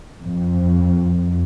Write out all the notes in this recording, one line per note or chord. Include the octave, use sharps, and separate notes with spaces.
F2